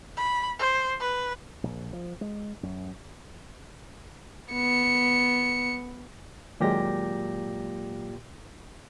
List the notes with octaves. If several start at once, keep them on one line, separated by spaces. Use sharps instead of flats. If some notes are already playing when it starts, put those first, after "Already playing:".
B5
C5
B4
A#1
F3
G#3
F#2
B3 C#7
D#2 A#2 F#3 G#3 G4 A#6